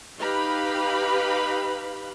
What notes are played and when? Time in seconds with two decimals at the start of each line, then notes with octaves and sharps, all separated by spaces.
0.20 D#4 G4 B4 F5 B5